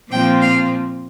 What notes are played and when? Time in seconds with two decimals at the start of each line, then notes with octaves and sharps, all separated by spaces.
0.11 A#2 F3 C4 G5
0.41 F5